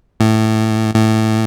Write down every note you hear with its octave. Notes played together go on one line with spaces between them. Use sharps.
A2
A2